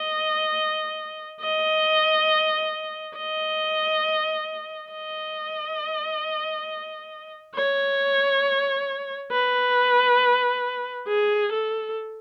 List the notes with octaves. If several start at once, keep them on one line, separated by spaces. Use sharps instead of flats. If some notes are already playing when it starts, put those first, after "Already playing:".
Already playing: D#5
D#5
D#5
D#5
C#5
B4
G#4
A4